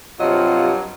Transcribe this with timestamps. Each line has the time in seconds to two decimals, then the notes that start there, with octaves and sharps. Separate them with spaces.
0.19 G2 C3 F#3 F4 D#5